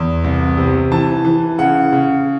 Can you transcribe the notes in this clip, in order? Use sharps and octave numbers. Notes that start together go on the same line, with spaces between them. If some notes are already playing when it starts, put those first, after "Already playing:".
Already playing: E2
C2
C3
E3 A5
E3
C#3 F#5
C#3